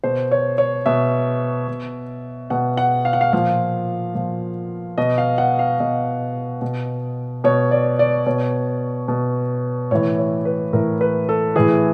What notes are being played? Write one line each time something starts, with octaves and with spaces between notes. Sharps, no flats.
B2 C5
C#5
C#5
B2 E5
B2
B2 F#5
F#5
F5
F#5
F5
A#2 F3 F5
A#2 F3
B2 D#5
F5
F#5
F5
B2 D#5
B2
B2 C#5
D5
D5
B2 C#5
B2
A2 E3 C#5
C#5
B4
A2 E3 A#4
B4
A4
A2 E3 G#4